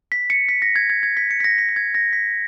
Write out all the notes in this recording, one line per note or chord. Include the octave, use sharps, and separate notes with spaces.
B6
C#7
B6
A#6
G#6
G#6
G#6
B6
C#7
B6
A#6
B6
A#6
G#6
A#6
B6